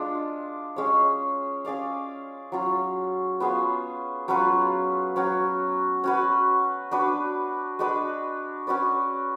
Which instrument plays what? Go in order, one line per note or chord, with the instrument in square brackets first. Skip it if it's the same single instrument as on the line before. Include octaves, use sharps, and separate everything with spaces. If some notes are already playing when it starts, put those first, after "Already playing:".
Already playing: [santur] G#3 D4 F4
G#3 C#4 G#4 C#5
C#4 G#4 D5 F5
F#3 C#4 F4
B3 F4 G#4 C#5
F#3 C#4 F4 B4
F#3 C#4 F#4
C#4 F#4 B4
D4 F#4 B4
G#3 D4 F#4 B4
C#4 F#4 B4 D5